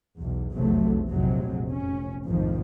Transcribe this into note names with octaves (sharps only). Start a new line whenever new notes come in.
B1 E2
F1 B1 E2 C3 F#3 A3
F1 A#1 F2 C3 F#3 G#3
F1 C#4
F1 A#1 F2 G#2 D#3 F3